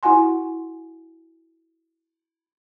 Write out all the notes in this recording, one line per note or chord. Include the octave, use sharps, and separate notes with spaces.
E4 F#4 F#5 G#5 C6